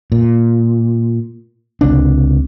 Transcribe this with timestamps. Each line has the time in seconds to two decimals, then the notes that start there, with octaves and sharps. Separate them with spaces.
0.12 A#2
1.81 C#2 C3 D4